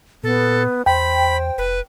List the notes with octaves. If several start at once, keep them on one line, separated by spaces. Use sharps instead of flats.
A#2 B3 A4
E2 C5 G5 B5
F1 B4